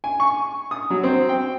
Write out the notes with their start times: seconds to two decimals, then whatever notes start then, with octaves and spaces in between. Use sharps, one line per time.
0.04 G#5
0.20 C#6
0.71 D#6
0.90 F#3
1.04 C4
1.29 G5